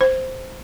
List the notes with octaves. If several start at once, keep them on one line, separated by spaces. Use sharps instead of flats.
C5